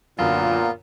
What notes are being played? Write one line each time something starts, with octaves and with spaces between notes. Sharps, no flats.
F#2 A#2 D3 B3 F4 A#4